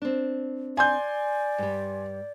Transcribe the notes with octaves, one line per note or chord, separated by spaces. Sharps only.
C4 D4
D5 G#5 C6 G6
G2 G3